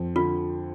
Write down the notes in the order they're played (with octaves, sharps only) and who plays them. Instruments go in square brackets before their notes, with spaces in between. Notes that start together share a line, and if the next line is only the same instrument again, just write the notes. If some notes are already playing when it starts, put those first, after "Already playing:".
Already playing: [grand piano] F2 C4
[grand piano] D3 [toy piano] F4